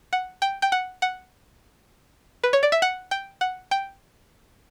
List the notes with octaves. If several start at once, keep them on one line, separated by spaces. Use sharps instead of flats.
F#5
G5
G5
F#5
F#5
B4
C#5
D5
E5
F#5
G5
F#5
G5